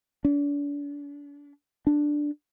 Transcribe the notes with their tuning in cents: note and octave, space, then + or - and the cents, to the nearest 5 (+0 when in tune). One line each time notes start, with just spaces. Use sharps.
D4 -40
D4 +5